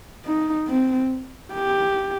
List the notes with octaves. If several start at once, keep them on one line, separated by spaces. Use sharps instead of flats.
D#4
C4
G4